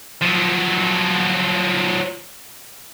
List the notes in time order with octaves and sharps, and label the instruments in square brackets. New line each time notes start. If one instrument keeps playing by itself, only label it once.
[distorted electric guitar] F3 F#3